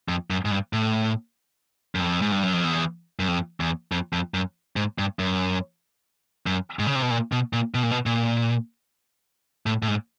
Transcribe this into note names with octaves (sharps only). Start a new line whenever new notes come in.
F2
F#2
G#2
G2
A2
F#2
F2
G#2
G2
F#2
F2
E2
F#2
F2
E2
F2
F2
F#2
G#2
G2
F#2
F#2
G#2
C#3
C3
B2
A#2
B2
A#2
B2
A#2
B2
A#2
A2
A2
G#2